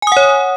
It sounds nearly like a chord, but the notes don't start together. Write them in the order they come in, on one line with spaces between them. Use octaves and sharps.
G#5 D#6 F#5 C#5